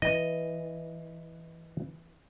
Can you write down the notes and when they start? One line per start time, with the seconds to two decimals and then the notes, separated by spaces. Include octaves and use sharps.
0.02 E3 D#5